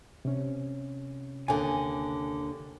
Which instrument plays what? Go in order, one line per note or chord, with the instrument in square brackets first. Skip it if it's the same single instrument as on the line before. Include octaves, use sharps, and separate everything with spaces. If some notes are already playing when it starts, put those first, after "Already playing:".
[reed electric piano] C3 C#4
[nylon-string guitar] D#2 D3 [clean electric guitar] G#5